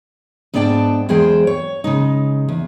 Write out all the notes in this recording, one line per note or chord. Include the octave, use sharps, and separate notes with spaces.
G#2 B3 D4 D5 G5 A5
E2 G#3 G#4 C5 G5
C#5
C#3 G#3 D#4
E2